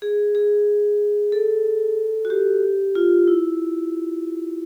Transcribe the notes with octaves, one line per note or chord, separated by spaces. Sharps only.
G#4
G#4
A4
F#4
G4
F4
E4